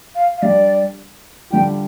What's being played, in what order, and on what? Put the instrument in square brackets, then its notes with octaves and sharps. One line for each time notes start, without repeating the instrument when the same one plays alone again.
[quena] F5
F5
[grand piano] G3 D4 G4 [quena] D5
[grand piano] D3 G3 D4 F4 [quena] G5